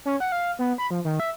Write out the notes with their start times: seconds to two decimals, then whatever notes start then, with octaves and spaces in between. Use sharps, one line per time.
0.05 C#4
0.20 F#5
0.32 F5
0.59 B3
0.78 B5
0.90 F3
1.05 D#3
1.20 E5